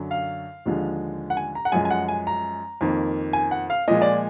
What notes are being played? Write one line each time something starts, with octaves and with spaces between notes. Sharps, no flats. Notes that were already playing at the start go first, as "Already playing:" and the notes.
Already playing: F#2 D3 F#3
F5
D#2 D3 F3 G#3
F#5
G#5
A#5
F#5
F#2 F3 G#3 G#5
G#5
F#5
G#5
A#5
F2 D#3 A#3
G#5
F#5
F5
A#2 F3 G#3 D#5
D5